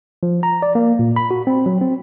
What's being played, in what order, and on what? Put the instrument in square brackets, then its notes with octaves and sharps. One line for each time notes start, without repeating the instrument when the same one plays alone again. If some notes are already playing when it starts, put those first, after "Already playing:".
[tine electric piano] F3
A#5
D5
A#3
A#2
B5
F#4
C4
F#3
C4